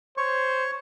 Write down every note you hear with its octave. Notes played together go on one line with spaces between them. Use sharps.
C5 C#5 C#6